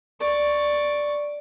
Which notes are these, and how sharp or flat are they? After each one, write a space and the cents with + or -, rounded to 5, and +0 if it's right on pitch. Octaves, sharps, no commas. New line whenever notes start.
D5 +0 C#6 +0